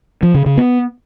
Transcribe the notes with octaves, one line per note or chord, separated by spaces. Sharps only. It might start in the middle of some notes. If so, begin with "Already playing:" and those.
F3
C#3
C#3
B3